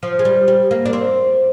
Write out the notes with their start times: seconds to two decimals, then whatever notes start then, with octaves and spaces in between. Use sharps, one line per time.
0.03 F3
0.19 G#3
0.25 G3
0.48 G3
0.71 A#3
0.86 D4
0.93 C4